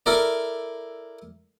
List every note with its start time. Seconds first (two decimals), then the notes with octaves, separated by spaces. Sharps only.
0.06 E4 A4 A#4 D5